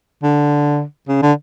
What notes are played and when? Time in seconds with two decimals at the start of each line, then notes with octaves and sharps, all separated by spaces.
0.23 D3
1.08 C#3
1.22 D3